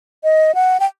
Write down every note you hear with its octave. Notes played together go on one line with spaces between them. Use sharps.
D#5
F#5
G5